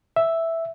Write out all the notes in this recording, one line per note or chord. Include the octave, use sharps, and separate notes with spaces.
E5